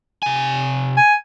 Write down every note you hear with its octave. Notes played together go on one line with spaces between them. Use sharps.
C3 G#5
G#5